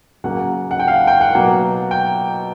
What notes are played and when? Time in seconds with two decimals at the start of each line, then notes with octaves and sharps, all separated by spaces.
0.24 C#3 F#3 A#3 F#5
0.71 F#5
0.79 G5
0.88 F5
0.93 F#5
1.07 G5
1.21 F#5
1.35 B2 F#3 A#3
1.91 G5